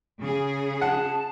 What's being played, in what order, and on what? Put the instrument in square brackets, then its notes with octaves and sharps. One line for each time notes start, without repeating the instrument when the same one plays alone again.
[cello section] C#3 G#4
[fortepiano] F#5 [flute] A5